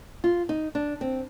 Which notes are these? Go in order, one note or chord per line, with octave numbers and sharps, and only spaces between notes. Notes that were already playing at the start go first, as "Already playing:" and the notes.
F4
D#4
D4
C4